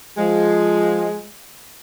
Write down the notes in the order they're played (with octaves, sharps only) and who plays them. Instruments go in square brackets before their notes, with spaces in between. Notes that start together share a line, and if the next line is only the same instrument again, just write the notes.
[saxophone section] F3 G#3